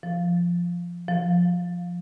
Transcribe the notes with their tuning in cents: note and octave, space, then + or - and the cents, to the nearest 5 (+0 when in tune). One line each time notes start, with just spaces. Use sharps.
F3 -5
F3 +10